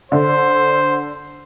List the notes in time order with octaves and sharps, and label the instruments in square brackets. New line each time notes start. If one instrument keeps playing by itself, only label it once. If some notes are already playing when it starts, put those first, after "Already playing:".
[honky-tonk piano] D3 [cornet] C5